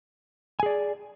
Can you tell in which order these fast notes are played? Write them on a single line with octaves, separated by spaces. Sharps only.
G#5 G#4 D5